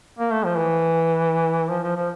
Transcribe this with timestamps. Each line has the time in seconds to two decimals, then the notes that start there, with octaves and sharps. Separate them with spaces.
0.19 A#3
0.32 A3
0.45 F3
0.57 E3
1.71 F3
1.83 F3
1.96 F3